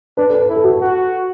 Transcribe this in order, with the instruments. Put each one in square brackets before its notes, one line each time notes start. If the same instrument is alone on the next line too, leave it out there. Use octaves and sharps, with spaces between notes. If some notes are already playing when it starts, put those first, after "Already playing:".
[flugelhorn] D4 [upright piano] B4
[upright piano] A4
B4
[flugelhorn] E4 [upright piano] B4
[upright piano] A4
F#4
A4
[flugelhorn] F#4